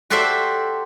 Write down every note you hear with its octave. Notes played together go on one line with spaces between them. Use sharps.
F#4 G4 A4 C5 D5 E5